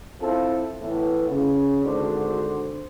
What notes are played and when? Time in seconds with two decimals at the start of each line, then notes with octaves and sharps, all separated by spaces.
0.21 C4 E4 F4 A4
0.81 A2 E3 A3 B3
1.29 C#3
1.84 G#1 D3 D4 F#4 C5